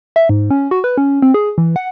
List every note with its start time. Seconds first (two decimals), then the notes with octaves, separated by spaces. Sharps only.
0.16 E5
0.29 G#2
0.50 C#4
0.71 F#4
0.84 B4
0.98 C#4
1.22 C4
1.34 G#4
1.58 E3
1.76 F#5